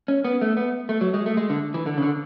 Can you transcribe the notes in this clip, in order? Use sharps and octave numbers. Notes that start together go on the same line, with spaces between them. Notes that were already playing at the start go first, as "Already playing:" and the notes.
C#4
B3
A3
B3
A3
F#3
G#3
A3
G#3
D3
E3
D3
C#3
D3